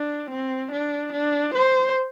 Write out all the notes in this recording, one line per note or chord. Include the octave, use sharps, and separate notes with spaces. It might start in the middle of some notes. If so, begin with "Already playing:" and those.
Already playing: D4
C4
D4
D4
C5